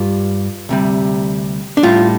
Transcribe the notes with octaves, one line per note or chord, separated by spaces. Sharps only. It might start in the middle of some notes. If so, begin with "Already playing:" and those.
Already playing: G2 G3 F4
D2 C3 G3
D4
A2 G3 F4